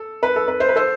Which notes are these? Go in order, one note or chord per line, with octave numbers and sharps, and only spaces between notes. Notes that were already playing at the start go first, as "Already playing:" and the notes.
Already playing: A4
B4
A4
B4
C5
B4
A4 C5